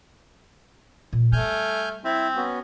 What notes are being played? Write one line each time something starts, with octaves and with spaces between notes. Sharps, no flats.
A#2
G3 A3 G#5 F6 G6
C4 E4 E5
B3 C#4 F#4